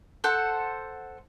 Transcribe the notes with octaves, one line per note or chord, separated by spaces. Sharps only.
A4 C5 F#5